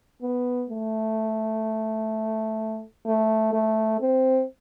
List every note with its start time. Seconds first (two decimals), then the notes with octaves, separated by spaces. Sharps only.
0.22 B3
0.70 A3
3.06 A3
3.53 A3
4.00 C4